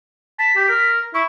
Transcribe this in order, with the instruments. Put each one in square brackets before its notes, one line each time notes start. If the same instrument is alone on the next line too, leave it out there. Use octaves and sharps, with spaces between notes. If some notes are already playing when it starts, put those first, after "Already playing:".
[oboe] A5 [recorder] B6
[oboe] G4
A#4
[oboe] E4 [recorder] C#6